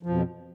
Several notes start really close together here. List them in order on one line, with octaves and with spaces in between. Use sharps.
F3 F2 B2